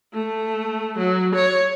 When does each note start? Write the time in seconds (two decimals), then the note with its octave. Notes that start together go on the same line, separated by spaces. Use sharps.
0.13 A3
0.98 F#3
1.35 C#5